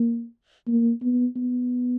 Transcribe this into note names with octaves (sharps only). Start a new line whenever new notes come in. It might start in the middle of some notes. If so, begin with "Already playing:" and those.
Already playing: A#3
A#3
B3
B3